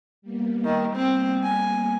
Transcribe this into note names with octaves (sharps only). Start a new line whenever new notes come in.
G3 A#3 B3
D#3
C4
G#5